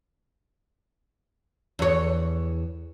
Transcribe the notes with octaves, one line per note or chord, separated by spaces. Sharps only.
E2 C#5